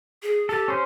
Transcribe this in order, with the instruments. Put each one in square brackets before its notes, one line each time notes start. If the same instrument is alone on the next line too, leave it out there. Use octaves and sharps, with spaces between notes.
[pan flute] G#4
[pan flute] G4 [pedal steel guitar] A4
[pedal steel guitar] C#4 C5